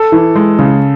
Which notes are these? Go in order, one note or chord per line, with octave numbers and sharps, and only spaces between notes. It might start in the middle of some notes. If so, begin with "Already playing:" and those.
Already playing: A4
E3
G#3
C#3